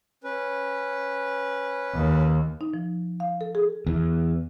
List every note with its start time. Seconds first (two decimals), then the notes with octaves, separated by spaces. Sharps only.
0.24 C#4 B4
1.94 D#2
2.61 D#4
2.74 F3
3.20 F5
3.41 A4
3.55 G#4
3.86 E2